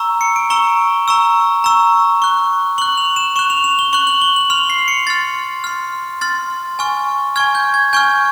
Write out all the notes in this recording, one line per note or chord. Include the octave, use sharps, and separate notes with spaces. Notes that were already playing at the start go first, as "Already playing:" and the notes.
Already playing: A#5 C#6 E6
C#7
D7
A#5 C#6 E6 G7
A#5 C#6 E6
A#5 C#6 E6
C#6 F#6
C#6 F#6 F#7
F7
E7
C#6 F#6 E7
F7
F7
G7
C#6 F#6 F#7
F#7
G7
F#7
C6 F6 F7
C7
C#7
C6 F6 A6
C6 F6
C6 F6 A6
G#5 C#6 F6
G#5 C#6 F6 G#6
G6
G#6
G#5 C#6 F6 G6